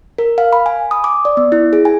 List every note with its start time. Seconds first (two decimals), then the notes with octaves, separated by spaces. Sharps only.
0.18 A#4
0.38 F5
0.53 B5
0.66 G#5
0.91 D#6
1.04 D6
1.25 D5
1.37 B3
1.52 E4
1.73 G#4
1.85 G#5